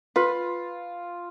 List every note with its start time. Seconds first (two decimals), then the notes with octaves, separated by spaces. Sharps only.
0.16 F4 B4